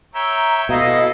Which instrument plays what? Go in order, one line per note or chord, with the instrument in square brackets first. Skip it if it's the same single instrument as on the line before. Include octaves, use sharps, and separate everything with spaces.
[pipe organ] C#5 E5 G5 [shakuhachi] A#5
[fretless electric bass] B2 [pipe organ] E4 A4 [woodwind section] D#5 [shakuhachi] F5